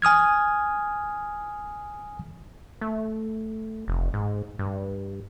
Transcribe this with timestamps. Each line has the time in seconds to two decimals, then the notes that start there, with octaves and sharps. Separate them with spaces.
0.02 G#5 D#6 F6 G#6
2.81 A3
3.88 F1
4.14 G#2
4.59 G2